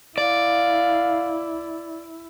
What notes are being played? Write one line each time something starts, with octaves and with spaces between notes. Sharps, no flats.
E4 D5 F5